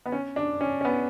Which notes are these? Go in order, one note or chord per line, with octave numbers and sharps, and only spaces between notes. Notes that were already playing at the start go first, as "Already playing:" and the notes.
B3
C#4
D4
C#4
C#4
B3